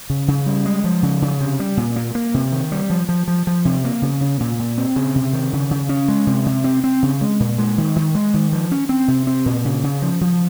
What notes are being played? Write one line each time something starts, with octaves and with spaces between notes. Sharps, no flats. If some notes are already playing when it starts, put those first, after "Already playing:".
C#3
C#3
G3
G#3
F3
C#3
C#3
C3
G3
A#2
A#3
A#3
C3
D#3
G3
F3
F3
F3
F3
C3
A#3
C#3
C#3
A#2
A#2
C4
C#3
C3
D#3
C#3
C#3
C#4
G#3
C3
C3
C4
C4
C#3
G#3
A#2
G#3
D#3
D#3
G#3
D#3
F3
C#4
C4
C3
C4
A#2
C#3
C#3
F3
F3